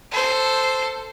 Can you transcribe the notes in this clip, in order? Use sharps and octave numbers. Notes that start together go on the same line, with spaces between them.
A4 C5